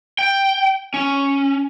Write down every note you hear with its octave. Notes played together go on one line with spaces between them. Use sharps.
G5
C#4